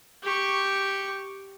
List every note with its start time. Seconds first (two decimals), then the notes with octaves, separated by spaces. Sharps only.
0.23 G4 C#6